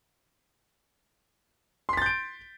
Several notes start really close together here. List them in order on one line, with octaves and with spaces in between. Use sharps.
C6 B6 A6 G6 D7